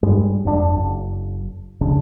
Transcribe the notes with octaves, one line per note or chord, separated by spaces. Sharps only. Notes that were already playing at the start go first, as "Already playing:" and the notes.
G2 G3 G#3
F1 F2 A#2 D4
F#1
F1 C#2 C#3 D4